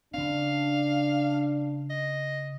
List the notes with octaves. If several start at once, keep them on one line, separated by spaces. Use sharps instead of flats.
C#3 C4 D4 F5
D#5